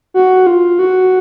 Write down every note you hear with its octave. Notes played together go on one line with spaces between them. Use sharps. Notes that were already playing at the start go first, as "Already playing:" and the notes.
F#4
F4
F#4